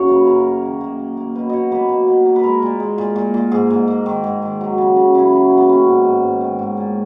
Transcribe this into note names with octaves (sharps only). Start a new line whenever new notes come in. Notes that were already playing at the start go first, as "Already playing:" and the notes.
Already playing: F#2 A#3 C#4 C#5
C#3 B4
F#2 A#4
A#3
D#3
A#3
A#3
A#3
B2 B4
B2 C#5 D#5
A#3 B4
B2
A#3
A#3
B4
G#3 A#4
A#2
G#3
A#2
A#2
A#2
G#2 G#4
G#2
A#3
D#3
G#2
D#3
F#3
C#3
C#3
C#3 E4
F#3
A#3
B3
D#3 C#4
G#2
G#2
G#2
D#3
G#2
A#2